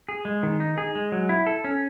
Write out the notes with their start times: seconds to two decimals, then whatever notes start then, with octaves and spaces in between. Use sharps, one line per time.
0.09 G#4
0.25 G#3
0.43 D#3
0.60 D#4
0.78 G#4
0.95 G#3
1.12 F#3
1.29 E4
1.46 A4
1.64 C#4